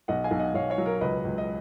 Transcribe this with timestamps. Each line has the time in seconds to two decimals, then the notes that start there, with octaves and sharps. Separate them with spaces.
0.08 B1 D#5 F#5
0.24 F5 G#5
0.31 B1
0.39 D#5 F#5
0.54 B1 C#5 F5
0.70 C#5 F5
0.78 F#3
0.86 A#4 C#5
1.01 C#2 B4 D#5
1.25 C#2
1.38 D#5